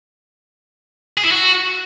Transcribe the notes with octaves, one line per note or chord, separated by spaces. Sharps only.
G#4
E4
F#4